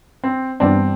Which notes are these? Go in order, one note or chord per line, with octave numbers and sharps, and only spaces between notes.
C4
G2 E3 G3 B3 C4 D4